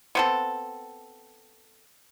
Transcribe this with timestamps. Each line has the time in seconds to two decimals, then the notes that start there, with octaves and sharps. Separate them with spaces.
0.15 B3 C4 A4